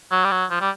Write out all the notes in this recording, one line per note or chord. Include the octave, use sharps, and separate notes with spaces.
F#3
G3
F#3
F3
G3